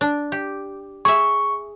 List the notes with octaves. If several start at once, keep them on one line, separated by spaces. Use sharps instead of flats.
D4
G4
G#4 E5 C#6